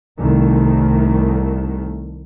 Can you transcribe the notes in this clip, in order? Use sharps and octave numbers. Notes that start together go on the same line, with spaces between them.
C2 D#3 A3